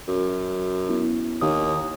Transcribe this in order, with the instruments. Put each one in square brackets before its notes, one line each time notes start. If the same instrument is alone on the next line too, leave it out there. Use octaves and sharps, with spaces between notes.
[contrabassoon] F#2
[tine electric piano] B3 E4
[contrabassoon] D#2 [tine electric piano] D#3 C#5 D#6